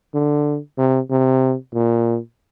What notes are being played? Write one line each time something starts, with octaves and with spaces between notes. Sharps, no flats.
D3
C3
C3
A#2